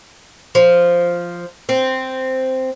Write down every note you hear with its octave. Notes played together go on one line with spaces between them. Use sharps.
F3
C4